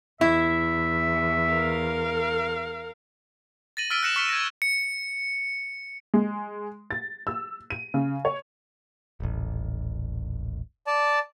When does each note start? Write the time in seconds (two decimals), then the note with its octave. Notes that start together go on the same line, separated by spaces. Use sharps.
0.21 E2 E4 E5
1.53 A#4 F5
3.77 A6 A#6 D#7 F#7
3.90 E6 F6 A6 B6 D7 D#7
4.03 F#6 A#6 C#7 E7 F#7
4.16 C#6 F6 B6 C#7
4.29 G#6 A#6
4.62 C#7
6.14 G#3
6.91 A6
7.27 E6
7.70 D#7
7.94 C#3
8.25 C#5
9.20 D#1 A1
10.87 D5 A5